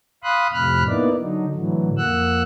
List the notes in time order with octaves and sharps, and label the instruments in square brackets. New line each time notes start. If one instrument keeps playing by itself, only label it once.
[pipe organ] F5 B5 C6 D#6 F#6
F2 A2 C3 B5 F6 F#6
A#3 B3 D#4 E4 D5
D3 F#3 D#4
A2 D3 E3 F#3
F2 A#3 F#5 E6 F#6